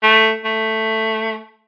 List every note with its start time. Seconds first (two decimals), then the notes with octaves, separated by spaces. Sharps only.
0.03 A3
0.45 A3